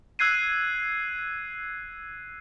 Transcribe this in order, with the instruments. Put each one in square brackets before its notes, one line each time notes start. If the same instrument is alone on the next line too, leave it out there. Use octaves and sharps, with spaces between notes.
[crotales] E6 F#6 G#6 C7 D#7